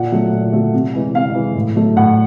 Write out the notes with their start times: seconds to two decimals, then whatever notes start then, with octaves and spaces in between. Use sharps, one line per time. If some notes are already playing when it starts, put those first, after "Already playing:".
Already playing: A#2 F#5
0.12 F#3 A3
0.32 A#2
0.53 F#3 A3
0.74 C3
0.93 E3 G#3
1.14 C3 F5
1.35 E3 G#3
1.56 A2
1.76 F#3 A3
1.96 A2 F#5